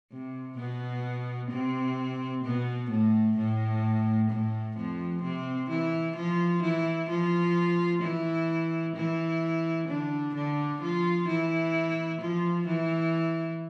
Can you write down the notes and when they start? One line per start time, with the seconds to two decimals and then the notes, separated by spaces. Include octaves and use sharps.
0.12 C3
0.58 B2 B3
1.51 C3 C4
2.44 B2 B3
2.90 A2 A3
3.37 A2 A3
4.30 A2 A3
4.77 F2 F3
5.23 C3 C4
5.70 E3 E4
6.16 F3 F4
6.63 E3 E4
7.09 F3 F4
8.02 E3 E4
8.95 E3 E4
9.88 D3 D4
10.35 D3 D4
10.81 F3 F4
11.28 E3 E4
12.21 F3 F4
12.67 E3 E4